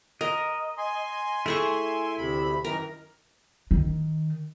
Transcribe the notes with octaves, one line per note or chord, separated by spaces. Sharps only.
A#4 D#5
G#5 C6
A3 E4 G#4 E5 C#6
D2 C3 B5
F#2 D#3 E3 A#4
D#3